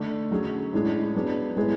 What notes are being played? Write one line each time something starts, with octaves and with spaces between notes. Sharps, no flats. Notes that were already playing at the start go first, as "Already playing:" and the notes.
Already playing: D3 A3 D4
F#3 C#4 G#4
A2 G#3 D4 G#4
F#3 B3 D4 G#4
A2 G#3 B3 E4 G#4